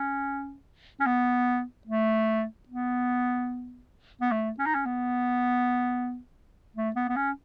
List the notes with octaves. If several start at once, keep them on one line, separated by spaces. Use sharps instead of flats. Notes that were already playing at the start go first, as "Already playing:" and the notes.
Already playing: C#4
C#4
B3
A3
B3
B3
A3
C#4
D#4
C#4
B3
A3
B3
B3
C#4